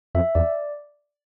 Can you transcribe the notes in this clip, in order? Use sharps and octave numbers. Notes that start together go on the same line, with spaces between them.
F2 E5
E2 D5